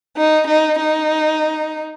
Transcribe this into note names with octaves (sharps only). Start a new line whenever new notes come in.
D#4
D#4
D#4